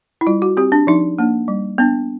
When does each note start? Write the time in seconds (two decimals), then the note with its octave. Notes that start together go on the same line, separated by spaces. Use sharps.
0.21 E4
0.27 G3 F4
0.42 F#4
0.57 C4 G4
0.72 D4
0.87 F3 D#4
1.19 A#3 D4
1.48 G3
1.78 B3 D4